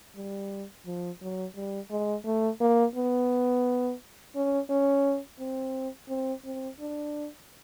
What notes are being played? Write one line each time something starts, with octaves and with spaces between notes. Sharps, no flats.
G3
F3
F#3
G3
G#3
A3
A#3
B3
C#4
C#4
C4
C4
C4
D4